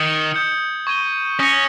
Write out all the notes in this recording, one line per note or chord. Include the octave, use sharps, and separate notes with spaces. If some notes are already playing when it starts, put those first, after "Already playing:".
Already playing: D#3 D#6 G#6 C#7 G7
D#6 G6 C#7
C#6 G#6 D#7 G7
C#4 D#6 A#6 C#7